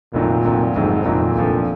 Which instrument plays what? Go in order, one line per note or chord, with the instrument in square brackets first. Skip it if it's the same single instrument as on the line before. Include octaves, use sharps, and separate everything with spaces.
[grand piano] F1 F2 D#3 F#3 [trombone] A#2
[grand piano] F1 F2 D#3 F#3
[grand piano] F1 F2 D#3 F#3 [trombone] G#2
[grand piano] F1 F2 D#3 F#3 [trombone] A#2
[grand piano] F1 F2 D3 F3 B3